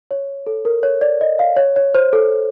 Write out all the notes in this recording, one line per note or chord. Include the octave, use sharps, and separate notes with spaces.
C#5
A4
A#4
C#5
D5
D#5
F5
C#5
C#5
C5
A4